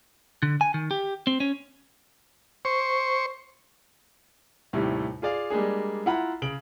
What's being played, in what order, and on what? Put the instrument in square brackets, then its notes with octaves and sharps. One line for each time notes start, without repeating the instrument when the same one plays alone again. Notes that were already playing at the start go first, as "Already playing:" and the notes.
[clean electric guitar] D3
G#5
D#3
G4
C4
C#4
[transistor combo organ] C5 C#6
[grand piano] D#2 A2 C3 G3
F4 G#4 D5 F5
G3 G#3 A#3 D4 G#4
E4 F4 F#5 A#5 B5
C#3 D7 F#7